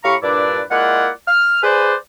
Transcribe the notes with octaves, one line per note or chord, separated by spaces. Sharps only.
A2 G4 F5 A#5 B5 C#6
G2 A#2 D4 E4 B4 D5
G#3 A#3 E4 F4 D5 F#5
F6
G#4 B4 C5 D5